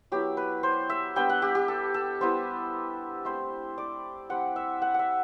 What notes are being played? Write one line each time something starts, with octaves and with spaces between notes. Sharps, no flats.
F#3 B3 E4 G4
B4
C5
E5
G3 B3 D4 G5
F#5
G4
G4
A4
A4
G3 B3 E4 C5
A3 C4 E4 C5
D5
G3 C4 E4 F#5
E5
F#5
E5 F#5